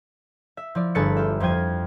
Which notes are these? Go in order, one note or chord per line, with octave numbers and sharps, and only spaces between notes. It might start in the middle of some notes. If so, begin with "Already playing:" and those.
E5
F3 E4 D5
G1 G#4 A4 B4 A6 C#7
F4 G4 E5
F2 F3 C5 G5 G#6 D#7